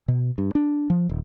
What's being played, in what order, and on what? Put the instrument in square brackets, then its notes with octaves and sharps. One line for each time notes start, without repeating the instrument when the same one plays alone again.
[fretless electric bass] B2
G2
D4
F3
D#1